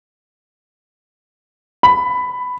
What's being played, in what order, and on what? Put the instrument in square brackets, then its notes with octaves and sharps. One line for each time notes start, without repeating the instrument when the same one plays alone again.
[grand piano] B5